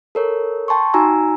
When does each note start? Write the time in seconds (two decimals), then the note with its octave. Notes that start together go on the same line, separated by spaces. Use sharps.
0.15 A4 A#4 C#5
0.68 G5 A5 C6 C#6
0.94 D#4 F#4 G#5 A#5 E6